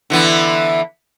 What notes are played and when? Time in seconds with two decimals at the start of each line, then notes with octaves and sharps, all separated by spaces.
0.10 D3 E3 B3